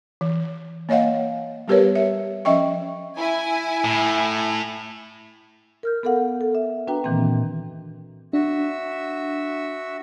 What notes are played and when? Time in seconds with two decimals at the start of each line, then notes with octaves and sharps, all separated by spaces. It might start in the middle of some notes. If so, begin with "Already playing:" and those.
0.21 E3
0.89 A#3 C#5 D#5 F5 F#5
1.68 G3 B3 G4 A#4 B4 C#5
1.96 E5
2.45 F3 C#4 D#5 E5 G5 C#6
3.17 E4 G#5
3.85 A2
5.83 A#4 F6 G6
6.03 B3 A4 A#4 F5 F#5
6.41 A4
6.55 E5
6.88 D4 F#4 B4 G5 A#5
7.04 A#2 D#3 E3 A#3 C4
8.33 D4 F#4 E5